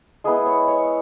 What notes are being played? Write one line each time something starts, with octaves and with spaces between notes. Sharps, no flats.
G#3 B3 E4 G#4
C#5
C#5